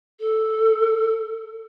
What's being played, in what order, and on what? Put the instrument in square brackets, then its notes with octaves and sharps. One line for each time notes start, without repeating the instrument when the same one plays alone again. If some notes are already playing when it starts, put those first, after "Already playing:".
[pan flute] A4